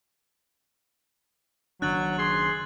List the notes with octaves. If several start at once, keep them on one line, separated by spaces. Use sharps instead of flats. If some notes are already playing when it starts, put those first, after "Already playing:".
F#1 D#3 F#3 D4 F#6 A6 F#7
G#4 C6